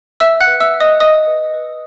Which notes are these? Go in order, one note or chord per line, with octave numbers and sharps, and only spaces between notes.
E5 E6
F#5 F#6
B4
E5 E6
E5
D#5 D#6
D#5 E5 D#6
B4
B4